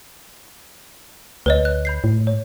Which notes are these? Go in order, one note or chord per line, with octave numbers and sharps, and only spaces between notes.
D2 B4 C#5 D#5
F#6
B5 G6 C7
A2
C#5